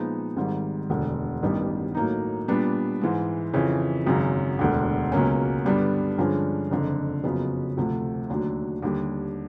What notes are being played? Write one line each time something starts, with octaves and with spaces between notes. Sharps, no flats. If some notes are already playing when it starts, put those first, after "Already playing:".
Already playing: A#2 F3 G#3 B3 D#4
G#1 G#2 D#3 G3
E1 D2 D3
A1 G2 D#3 G3 B3
A2 F#3 A#3 D#4
A#2 G3 B3 D4
G#2 E3 G#3
F2 C#3 E3
G#1 F#2 C#3
E1 D2 D3
C#2 B2 F#3 A#3 C#4
G2 D3 G3 B3 D4
G2 D3 F3 G#3 C#4
F#1 F2 D3 F3
F#1 F2 C#3 F#3 B3
D2 C3 F3 A3
D#2 D3 F#3 A3
D#2 D3 G3